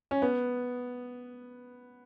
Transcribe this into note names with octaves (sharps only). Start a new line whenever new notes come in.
C#4
B3